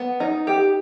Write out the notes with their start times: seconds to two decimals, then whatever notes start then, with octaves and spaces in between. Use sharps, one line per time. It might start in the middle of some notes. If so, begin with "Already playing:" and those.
Already playing: B3
0.20 D#4
0.47 G4